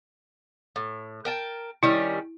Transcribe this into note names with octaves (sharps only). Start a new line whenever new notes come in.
A2
A#4 G5 A5
D#3 G3 C#4 E4